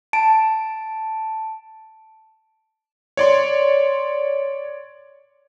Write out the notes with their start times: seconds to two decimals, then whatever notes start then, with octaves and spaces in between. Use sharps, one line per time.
0.13 A5 D7
3.17 C#5 D5 C6